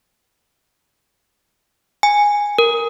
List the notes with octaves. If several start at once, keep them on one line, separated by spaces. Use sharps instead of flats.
G#5
A#4